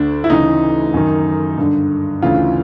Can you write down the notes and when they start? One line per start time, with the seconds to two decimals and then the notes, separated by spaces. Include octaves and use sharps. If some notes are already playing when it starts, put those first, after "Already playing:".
Already playing: D2 D3 D4
0.24 E4
0.30 D2 C#3 E3 D#4
0.94 F#2 D#3
1.58 G2 D3
2.22 D2 C#3 E3 F4